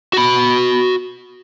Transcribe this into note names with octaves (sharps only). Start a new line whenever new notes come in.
F#4 B5